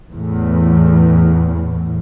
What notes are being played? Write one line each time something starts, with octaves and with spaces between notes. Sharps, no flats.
E2 A2